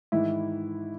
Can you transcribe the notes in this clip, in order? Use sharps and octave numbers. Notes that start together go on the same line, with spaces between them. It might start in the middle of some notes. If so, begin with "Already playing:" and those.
G#2 D#3 E3 E4